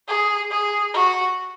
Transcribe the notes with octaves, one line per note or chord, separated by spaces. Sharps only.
G#4
G#4
F#4